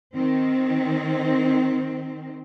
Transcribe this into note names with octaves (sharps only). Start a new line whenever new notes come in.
D#3 C4